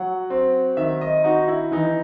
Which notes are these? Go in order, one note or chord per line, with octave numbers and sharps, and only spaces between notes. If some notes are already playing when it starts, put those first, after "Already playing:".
Already playing: F#3 F#5
C4
D#3 E5
D#5
D#4 F#4
E4
E3 D#4